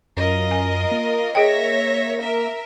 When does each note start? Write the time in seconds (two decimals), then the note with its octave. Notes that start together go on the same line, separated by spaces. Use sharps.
0.17 F#2 F4 A#4 D#5
0.51 G#5
0.91 A#3
1.35 G#4 C#5 D#5 E5 G5 A#6
2.21 A#4 E5